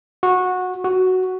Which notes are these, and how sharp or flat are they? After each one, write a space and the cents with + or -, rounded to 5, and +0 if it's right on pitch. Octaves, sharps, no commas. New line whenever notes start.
F#4 -15
F#4 +5